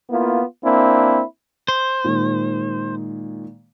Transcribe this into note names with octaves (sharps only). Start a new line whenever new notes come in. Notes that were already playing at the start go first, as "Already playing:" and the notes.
A#3 B3 E4 F4
A#3 C4 D4 E4
C5
A#2 D#3 G#3